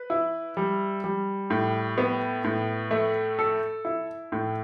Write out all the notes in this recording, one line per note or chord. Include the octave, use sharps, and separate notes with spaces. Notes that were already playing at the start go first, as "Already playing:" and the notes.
Already playing: B4
E4
G3
G3
A2
B3
A2
A3
A4
E4
A2